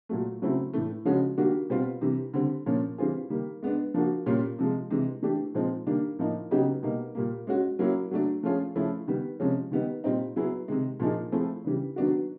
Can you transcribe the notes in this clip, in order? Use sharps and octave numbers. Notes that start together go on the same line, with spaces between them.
A#2 F#3 A3
C#3 F#3 A3 C4 E4
A2 E3 A3
C#3 F3 G#3 C#4 F#4
D#3 G3 A#3 D4 F#4
B2 G3 C4 F4
C3 E3 G3
D3 G3 C4
A#2 F3 A#3 C#4
E3 G3 C4 F4 G#4
D#3 G3 A#3
G#3 B3 D4
F3 A#3 D4 F#4
A#2 G3 A#3 C#4 F4
C3 F3 G#3
C3 E3 G#3
E3 A3 D4 G4
A#2 F3 G#3 C4 D#4
D#3 G3 A#3 D4
A2 F3 A#3 D#4
C#3 F#3 B3 D#4 G4
B2 G3 A#3 D#4
A#2 G3 A#3
G#3 C#4 F#4
F#3 A#3 C#4 E4
F#3 A3 D4
F3 A3 C#4 F4 G#4
F3 A3 C#4 E4 G#4
D#3 G3 B3
C3 F3 G#3 C#4
D#3 G3 B3 D#4
A#2 G3 C4 D#4
F#3 B3 E4 G#4
C3 D#3 G#3
A#2 F3 A#3 D#4 G#4
F3 A3 C4 E4 G#4
C#3 E3 G3
D#3 F#3 B3 D4 F#4